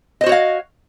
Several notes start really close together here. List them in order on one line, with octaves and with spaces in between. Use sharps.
D#5 C5 F#4 C#5 F5